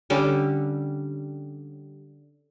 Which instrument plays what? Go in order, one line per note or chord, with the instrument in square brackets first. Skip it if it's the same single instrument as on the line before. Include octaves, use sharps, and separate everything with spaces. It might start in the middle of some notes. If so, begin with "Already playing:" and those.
[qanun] D3 G3 C#4 A4